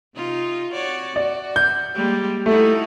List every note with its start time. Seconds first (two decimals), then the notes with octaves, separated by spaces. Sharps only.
0.15 C3 D#4 F4
0.72 F#4 C#5 D5
1.16 F#4 D5
1.56 G6
1.94 G3 G#3 A#3
2.46 A3 D#4 E4 F#4